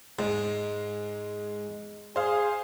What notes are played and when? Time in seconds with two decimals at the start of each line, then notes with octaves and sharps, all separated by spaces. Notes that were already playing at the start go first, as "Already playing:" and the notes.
0.19 G#2 G#3
2.16 G#4 C5 F5